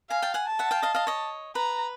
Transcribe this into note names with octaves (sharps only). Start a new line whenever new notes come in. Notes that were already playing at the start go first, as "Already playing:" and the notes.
F5 G#5 A#5
G5 A5
F#5 G#5
A5
E5 F#5
F5 G5
D#5 F5
D#5 F5
C#5 D#5
B4 A#5